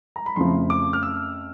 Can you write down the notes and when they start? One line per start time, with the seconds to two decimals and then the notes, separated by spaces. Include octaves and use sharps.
0.16 A#5
0.26 B5
0.36 F2 C#3 F3 A3 C6
0.70 D6
0.93 F6
1.03 E6